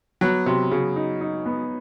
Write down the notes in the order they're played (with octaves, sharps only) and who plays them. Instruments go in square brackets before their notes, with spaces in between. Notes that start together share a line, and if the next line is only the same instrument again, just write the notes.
[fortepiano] F#3 [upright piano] B3
[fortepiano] C3 [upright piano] F#3
[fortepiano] C#3 [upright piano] F#3
[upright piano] D#4
D#4
B3